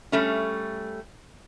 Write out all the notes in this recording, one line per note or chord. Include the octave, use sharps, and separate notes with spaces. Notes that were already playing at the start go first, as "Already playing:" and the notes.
G3 A3 C#4